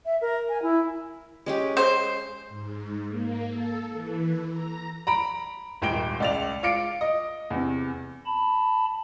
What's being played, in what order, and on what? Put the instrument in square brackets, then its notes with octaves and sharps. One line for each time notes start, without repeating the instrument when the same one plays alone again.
[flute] E5
A#4
G#5
E4
[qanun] G#3 C#4 G4
[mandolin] C5
[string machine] G#2
A#3
A4
E3
A#5
[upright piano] A#5 B5 D7
D#1 G#1 G5 D7 G7
C#2 D5 F7
F4 F5 D6 C#7 D7
D#5
E2 C3
[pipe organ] A5 B5